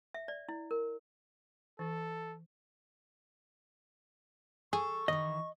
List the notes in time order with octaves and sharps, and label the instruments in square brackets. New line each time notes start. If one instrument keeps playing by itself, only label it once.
[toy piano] E5
D5
E4
A#4
[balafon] E3 [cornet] A4
[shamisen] G#4 [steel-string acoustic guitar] A4 [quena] C#6
[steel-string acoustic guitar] D#3 E3 [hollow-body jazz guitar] D#5